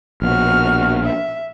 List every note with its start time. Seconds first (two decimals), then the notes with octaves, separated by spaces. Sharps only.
0.22 A#1 B2 F#4 F6
1.04 E5